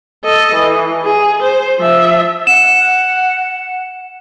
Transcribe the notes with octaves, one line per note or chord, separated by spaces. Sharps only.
A4 D#5
E3
G#4
C5
F3 E5
F#5 E7